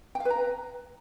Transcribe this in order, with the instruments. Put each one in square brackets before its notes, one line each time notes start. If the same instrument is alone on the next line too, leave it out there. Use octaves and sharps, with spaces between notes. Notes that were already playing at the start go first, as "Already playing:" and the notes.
[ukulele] G5
F5
B4
A#5